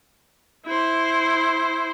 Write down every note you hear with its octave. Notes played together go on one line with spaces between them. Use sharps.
E4 C5